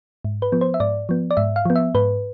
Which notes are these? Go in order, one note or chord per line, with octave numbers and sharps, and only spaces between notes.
G#2
B4
F3 B3
C5
E5
G#2 D5
F3 B3
D5
G#2 E5
F5
F3 B3
E5
G#2 B4